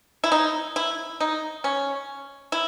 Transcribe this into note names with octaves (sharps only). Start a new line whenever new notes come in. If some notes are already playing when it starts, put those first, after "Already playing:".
E4
D#4
E4
D#4
C#4
E4